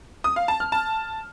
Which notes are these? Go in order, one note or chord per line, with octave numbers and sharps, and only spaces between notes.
D#6
F5
A5
F6
A5